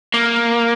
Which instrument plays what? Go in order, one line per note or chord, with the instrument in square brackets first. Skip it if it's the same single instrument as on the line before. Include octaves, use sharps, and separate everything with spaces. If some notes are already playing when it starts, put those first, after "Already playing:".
[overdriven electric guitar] A#3